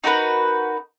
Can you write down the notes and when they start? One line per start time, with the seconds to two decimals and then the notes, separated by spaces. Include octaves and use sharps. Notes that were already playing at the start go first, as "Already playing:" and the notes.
0.04 D#4 F#4 A#4 B4